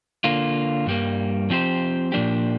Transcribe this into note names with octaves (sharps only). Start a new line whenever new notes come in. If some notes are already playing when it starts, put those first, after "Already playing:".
D3 A#3 F4
G2 G3 A#3
F3 C4 G4 C5
A#2 F3 A#3 D4 G4